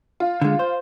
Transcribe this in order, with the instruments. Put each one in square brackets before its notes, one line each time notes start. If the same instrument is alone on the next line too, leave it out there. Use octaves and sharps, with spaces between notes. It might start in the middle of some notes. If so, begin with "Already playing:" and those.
[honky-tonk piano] F4
[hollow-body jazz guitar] D3 G#3
C5